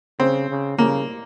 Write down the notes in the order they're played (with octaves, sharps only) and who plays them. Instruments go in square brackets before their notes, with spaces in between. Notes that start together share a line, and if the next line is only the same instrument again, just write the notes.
[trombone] C#3 [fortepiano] C4
[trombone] C#3
[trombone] C#3 [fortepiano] A#3